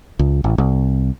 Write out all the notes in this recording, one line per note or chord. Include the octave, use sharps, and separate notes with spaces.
C#2
A1
C2